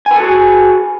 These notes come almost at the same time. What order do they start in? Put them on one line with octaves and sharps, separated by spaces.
G#5 B4 A4 F#4 G#4